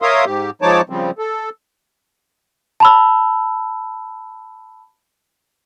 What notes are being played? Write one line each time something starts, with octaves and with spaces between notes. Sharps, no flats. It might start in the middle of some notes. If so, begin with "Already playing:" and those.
A#4 C#5 E5 F5 C6 D#6
G#2 G4
F3 G#3 D#4 C#5 A5 D6
C#3 F3 G3 C4
A4
A5 B5 E6